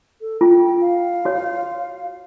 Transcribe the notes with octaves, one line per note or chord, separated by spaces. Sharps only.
A4
F4 G5
F5
F#4 C#5